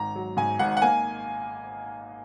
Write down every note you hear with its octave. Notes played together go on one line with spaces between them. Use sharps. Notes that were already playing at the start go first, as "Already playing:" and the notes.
Already playing: G#1 A#5
F#3
G#2 G#5
G#1 F#5
F#5
A#3 G#5